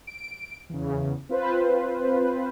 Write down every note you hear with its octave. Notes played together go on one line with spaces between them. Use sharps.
D7
E2 C#3
C4 F4 B4 C5